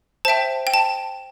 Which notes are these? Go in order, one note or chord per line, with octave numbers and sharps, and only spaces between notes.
C5 E5 G5 A5
G5
A5